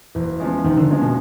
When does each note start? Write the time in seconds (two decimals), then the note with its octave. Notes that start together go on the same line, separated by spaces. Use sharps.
0.15 F#1 E3
0.40 E2 C#3 F3 G#3
0.64 F#1 D#3
0.77 D3
0.90 E2 C#3 F3 G#3
1.02 B2